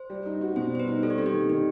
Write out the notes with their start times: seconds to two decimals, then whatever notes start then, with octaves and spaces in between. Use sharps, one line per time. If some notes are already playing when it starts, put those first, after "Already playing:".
Already playing: C5
0.10 G3
0.26 D#4
0.41 F#4
0.56 B2 C5
0.71 G3 C5
0.80 B4
0.88 D#4
1.03 G3 A4
1.10 G4
1.18 C4 A4
1.26 G4
1.34 D#3
1.49 D#3 G4